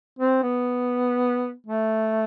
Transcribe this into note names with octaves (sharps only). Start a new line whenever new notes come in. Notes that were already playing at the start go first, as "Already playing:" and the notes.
C4
B3
A3